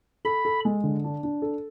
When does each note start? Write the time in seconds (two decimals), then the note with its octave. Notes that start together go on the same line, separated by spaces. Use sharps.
0.25 A4 B5
0.45 A4
0.65 G#3
0.84 D3
1.04 D4
1.23 D4
1.42 A4